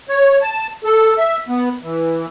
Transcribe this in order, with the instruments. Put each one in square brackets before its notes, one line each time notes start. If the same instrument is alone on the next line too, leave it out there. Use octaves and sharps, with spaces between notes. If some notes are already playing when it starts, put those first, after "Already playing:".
[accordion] C#5
A5
A4
E5
B3
E3